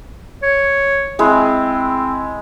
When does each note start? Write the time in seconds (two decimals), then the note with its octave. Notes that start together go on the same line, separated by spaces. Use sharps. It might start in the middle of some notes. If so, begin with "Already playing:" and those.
0.43 C#5
1.19 G#3 C4 E4